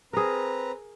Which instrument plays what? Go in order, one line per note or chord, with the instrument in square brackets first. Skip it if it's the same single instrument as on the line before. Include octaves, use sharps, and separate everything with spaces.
[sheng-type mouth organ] C4 B4 A#5 [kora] G#4 A#4